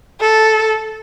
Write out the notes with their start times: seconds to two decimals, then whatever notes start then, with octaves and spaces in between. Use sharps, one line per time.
0.20 A4